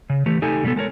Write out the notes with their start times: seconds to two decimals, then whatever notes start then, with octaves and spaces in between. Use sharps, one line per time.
0.10 C#3
0.26 E3 A3 G4
0.42 D#4 G4 A4 G#5
0.64 B2 G3 G#3 B3 A4
0.76 G#3 A4 A#4 C#5